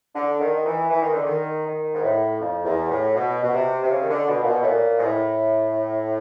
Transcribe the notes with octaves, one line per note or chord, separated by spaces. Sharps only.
D3
D#3
E3
E3
D#3
D3
D#3
D#3
G#2
A2
F2
E2
A2
B2
B2
C3
C3
C#3
D#3
D3
B2
A#2
B2
A2
A#2
G#2
A2